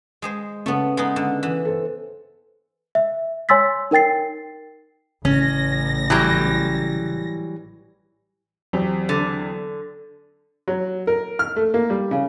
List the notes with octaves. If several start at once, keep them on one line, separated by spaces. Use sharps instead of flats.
G#3 G#4 C5
C#3 A3 B3
G#3 B3 D#4
D3
E3
A4 C5
E5
C#5 G#5 C6 E6 A6 B6
D#4 A#4 G5 A6 C7
A1 C#3 C#4 A#6
E3 F#3 G3
E2 F#3 C4 G4
D3
F#3
A#4
F6
A3
A#3
G3
C#3